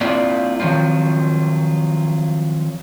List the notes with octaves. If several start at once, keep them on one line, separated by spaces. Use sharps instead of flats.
A#3 C4 D4 E4 F4 D5
D#3 F3 F#3 C4 F4